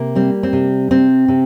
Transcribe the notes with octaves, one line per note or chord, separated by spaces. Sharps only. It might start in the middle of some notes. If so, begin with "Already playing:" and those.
Already playing: C3 A#3
G3 C4
C4
C3
C3 C4
C3